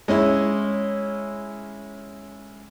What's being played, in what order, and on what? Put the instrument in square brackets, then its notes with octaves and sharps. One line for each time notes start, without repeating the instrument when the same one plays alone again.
[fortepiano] G#3 C#4 E4